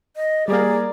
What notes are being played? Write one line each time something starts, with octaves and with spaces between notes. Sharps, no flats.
D#5
G3 A#3 G#4 A#4 D5